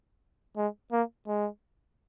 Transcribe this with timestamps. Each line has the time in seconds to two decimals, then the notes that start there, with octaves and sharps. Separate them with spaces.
0.57 G#3
0.92 A#3
1.27 G#3